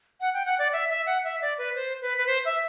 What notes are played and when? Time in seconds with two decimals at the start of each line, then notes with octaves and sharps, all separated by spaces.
0.21 F#5
0.34 G5
0.46 F#5
0.59 D5
0.73 E5
0.90 E5
1.06 F#5
1.24 E5
1.42 D5
1.58 B4
1.75 C5
2.01 B4
2.18 B4
2.27 C5
2.45 E5